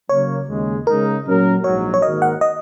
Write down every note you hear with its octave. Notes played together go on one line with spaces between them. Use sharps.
C#3 F#3 A#3 C#5
D#2 C#3 G#3
C#3 G#3 D#4 A#4
A#2 F#3 C#4 A#4
A#1 G#2 F#3 C#5
C#5
G#2 D#3 A#3 F#4 A#4 D#5
F#5
D#5